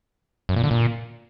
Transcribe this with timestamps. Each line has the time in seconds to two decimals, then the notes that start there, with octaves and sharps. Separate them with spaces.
0.49 F#2
0.56 A#2
0.64 D3
0.71 A#2